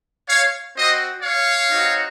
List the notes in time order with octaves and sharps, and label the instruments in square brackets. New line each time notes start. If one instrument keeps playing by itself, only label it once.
[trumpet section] C#5 F5
C4 F#4 C5 D#5
C#5 F5
C4 D#4 F#4